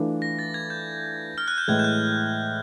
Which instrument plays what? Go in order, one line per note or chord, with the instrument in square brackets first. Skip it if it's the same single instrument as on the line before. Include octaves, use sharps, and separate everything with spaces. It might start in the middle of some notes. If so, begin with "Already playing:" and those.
Already playing: [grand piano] E3 A3 D4 F4
[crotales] A#6
A6
G#6
G6
F6
F#6
G6
[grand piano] A2 E3 G#3 [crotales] G#6
[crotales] G6
F#6